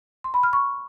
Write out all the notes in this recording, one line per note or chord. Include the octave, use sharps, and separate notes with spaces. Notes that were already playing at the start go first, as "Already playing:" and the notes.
C6
B5
F6
C#6